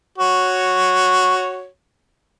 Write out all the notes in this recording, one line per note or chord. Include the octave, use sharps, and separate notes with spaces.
F#4 C#5